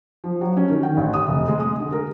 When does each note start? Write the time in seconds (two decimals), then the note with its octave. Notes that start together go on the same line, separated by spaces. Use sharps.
0.24 F3
0.41 F#3
0.57 C#4
0.70 D#3
0.83 G5
0.97 A1
1.13 D#6
1.28 F1
1.48 G#3
1.60 D#6
1.80 D3
1.92 A#4